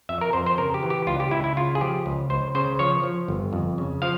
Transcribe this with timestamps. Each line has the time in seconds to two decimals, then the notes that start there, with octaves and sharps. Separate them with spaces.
0.09 F2 E5
0.21 A#4
0.33 F2 C5
0.46 C5
0.58 C#3 A#4
0.74 G4
0.83 E3
0.90 G4
1.07 C#2 F4
1.20 G4
1.31 C#2 E4
1.44 E4
1.57 C#3 F4
1.75 G#4
1.81 F3 G4
2.06 C#2
2.30 C#2 C5
2.55 C#3 C5
2.79 F3 C#5
3.03 F3
3.28 G1
3.53 F2
3.78 C#3
4.02 F3 F5